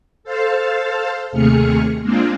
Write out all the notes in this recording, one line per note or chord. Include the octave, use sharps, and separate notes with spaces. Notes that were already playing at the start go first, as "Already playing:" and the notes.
A4 C5 F5 A5
D#2 C3 A3 G#4 F6 C#7
G#3 A#3 C4 D4 F4